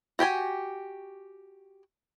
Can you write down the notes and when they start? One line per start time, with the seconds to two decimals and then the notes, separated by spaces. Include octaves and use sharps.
0.19 F#4 G4 G5 G#5